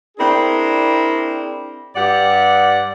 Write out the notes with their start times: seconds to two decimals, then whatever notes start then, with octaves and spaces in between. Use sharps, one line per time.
0.17 C4 D4 E4 G#4 A#4
1.95 G2 G4 D5 F#5